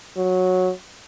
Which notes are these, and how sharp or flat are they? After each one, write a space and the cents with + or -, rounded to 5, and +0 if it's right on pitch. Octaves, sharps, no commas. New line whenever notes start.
F#3 -10